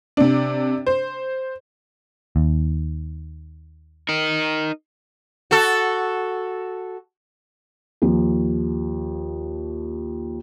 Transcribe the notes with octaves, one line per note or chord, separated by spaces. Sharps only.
C3 D4
C5
D#2
D#4 A#4
F#4 A4
D#2 F3